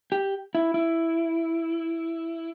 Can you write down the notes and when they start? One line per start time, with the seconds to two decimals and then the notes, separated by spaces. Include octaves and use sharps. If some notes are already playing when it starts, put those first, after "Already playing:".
0.12 G4
0.55 E4
0.74 E4